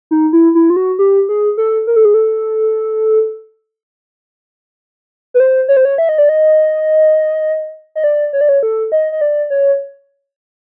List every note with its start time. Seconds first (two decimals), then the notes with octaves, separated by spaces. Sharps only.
0.11 D#4
0.33 E4
0.55 E4
0.70 F4
0.76 F#4
0.99 G4
1.29 G#4
1.57 A4
1.87 A#4
1.96 A4
2.05 G#4
2.14 A4
5.34 B4
5.40 C5
5.69 C#5
5.77 C5
5.85 C#5
5.98 E5
6.09 D#5
6.18 D5
6.29 D#5
7.95 D#5
8.04 D5
8.33 C#5
8.41 D5
8.49 C#5
8.63 A4
8.92 D#5
9.12 D#5
9.21 D5
9.50 C#5